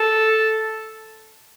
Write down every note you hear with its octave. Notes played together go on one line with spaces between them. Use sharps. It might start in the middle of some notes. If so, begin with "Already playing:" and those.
Already playing: A4